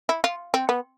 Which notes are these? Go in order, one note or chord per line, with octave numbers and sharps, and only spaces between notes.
E4
F4
C4
B3